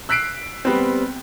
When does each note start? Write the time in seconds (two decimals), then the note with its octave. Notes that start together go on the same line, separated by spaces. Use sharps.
0.09 E6 F#6 B6 C7 D7
0.65 G3 B3 C4